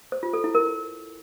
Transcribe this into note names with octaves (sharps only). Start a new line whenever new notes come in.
C5
F4
A4
E4
A#4